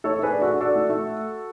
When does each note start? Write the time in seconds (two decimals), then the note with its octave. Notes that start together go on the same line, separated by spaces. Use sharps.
0.04 A3 A4 C#5
0.19 A3 G#4 B4
0.32 D4
0.42 F#4 A4
0.48 D4
0.60 D4 F#4 A4
0.75 A3
0.90 A3